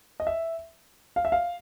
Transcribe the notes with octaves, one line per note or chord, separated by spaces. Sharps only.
D#5
E5
F5
E5
F5